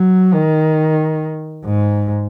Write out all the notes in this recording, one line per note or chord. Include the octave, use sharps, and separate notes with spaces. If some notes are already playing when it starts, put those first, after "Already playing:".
Already playing: F#3
D#3
G#2